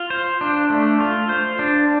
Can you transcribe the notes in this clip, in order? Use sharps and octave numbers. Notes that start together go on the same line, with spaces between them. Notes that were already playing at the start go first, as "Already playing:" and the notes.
Already playing: F4
C5
D4
A3
F4
C5
D4